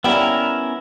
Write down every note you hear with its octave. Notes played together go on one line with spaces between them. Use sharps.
F3 G3 B3 C#4 E4 A#4 G5